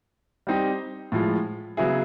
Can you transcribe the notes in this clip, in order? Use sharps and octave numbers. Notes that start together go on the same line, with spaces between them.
G3 C4 D#4 G4
A2 F3 G#3
C#3 F#3 B3 E4 G#4